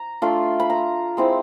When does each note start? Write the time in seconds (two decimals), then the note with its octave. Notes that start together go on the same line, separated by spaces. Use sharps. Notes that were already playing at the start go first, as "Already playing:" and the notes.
Already playing: A#5
0.22 A3 D4 F4
0.60 B5
0.70 A#5
1.17 G#3 C4 E4